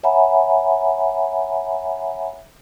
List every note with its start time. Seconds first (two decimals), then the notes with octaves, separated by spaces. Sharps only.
0.03 C#5 E5 F#5 G#5 A#5 B5